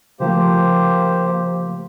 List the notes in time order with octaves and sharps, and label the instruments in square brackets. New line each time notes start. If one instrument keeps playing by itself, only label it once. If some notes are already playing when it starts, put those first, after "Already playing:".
[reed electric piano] C#3 F3 A3 [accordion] A#3 G4 C5